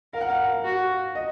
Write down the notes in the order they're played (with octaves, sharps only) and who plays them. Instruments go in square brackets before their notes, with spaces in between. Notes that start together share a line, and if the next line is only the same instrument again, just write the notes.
[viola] A#4 [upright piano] F5
[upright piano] F#5
F5
[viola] F#4
[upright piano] D#5